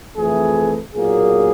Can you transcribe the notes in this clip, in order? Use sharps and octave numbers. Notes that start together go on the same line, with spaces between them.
F2 C3 E3 A3 G#4
B1 A#2 F#3 A#3 G#4